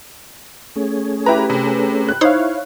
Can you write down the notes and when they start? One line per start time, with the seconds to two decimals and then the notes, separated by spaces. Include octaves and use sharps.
0.76 A3 C#4 G#4
1.26 E4 G4 B4 A#5
1.50 C3
2.09 F#6
2.21 D#4 E4 C5 C#5 F5